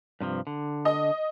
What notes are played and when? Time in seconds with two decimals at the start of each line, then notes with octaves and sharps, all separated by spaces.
0.21 G2 C3 F3
0.47 D3
0.85 D#5